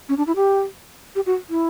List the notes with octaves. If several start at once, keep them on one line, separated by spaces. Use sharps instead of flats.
C#4
D4
E4
G4
G4
F#4
E4